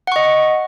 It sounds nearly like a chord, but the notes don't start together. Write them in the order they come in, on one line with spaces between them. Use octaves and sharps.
F#5 C#6 D#5